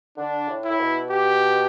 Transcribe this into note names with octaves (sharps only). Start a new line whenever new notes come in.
D3 D4
A2
E4
A2
B2
G4